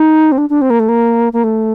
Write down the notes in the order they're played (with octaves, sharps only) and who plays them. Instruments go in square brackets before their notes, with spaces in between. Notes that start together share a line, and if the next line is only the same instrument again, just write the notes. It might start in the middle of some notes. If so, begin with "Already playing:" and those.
Already playing: [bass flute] D#4
C4
D4
D4
C4
A#3
A3
A#3
A#3
A3